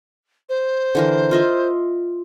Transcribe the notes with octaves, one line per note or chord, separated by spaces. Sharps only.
C5
D3 E3 A#4
F4 D#5 E5